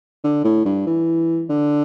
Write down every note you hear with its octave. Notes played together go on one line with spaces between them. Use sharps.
D3
A2
G2
E3
D3